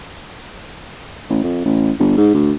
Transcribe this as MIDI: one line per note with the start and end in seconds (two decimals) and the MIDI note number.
1.30 1.39 33
1.44 1.65 41
1.65 1.91 33
2.00 2.17 31
2.18 2.30 44
2.35 2.52 38